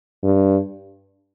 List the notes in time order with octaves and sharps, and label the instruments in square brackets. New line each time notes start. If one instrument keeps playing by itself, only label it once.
[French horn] G2